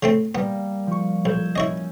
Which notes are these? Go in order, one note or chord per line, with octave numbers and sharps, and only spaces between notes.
C#3 A3 C4
G3 A#3 B3
F3 C#6
B1 E6 G6 G#6
C#4 E4 C#5 D#5